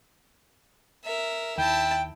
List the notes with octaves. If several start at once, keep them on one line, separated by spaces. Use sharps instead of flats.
A#4 E5
D#2 E4 G5 A5